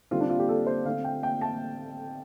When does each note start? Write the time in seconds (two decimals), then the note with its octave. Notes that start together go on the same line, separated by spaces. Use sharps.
0.11 D3 G3 C4 F4
0.21 D4
0.30 F4
0.39 G4
0.49 A4
0.67 C5
0.85 D3 A3 C4 F5
1.04 G5
1.23 G5
1.41 A5